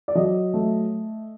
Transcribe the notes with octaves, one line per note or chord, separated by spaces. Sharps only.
D5
F#3 D#5
A3